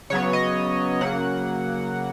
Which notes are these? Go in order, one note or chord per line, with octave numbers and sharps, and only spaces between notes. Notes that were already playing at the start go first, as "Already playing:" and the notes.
C#3 F#3 B3 C#5
D#5
C#3 F#3 A#3 F#5